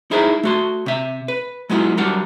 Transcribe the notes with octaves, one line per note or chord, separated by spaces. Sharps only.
D#4 E4 G#4 A#4 C5 E5
A3 F#4 C6
C3 E5
B4
F#3 G#3 B3 E4 F4
F#3 G3 D4 G4 A#4 F#5